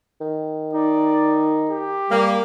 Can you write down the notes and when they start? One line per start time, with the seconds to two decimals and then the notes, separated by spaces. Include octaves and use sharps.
0.21 D#3
0.74 D#4 D5
1.70 G4
2.10 G3 A#3